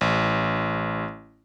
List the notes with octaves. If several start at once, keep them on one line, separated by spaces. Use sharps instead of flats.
A1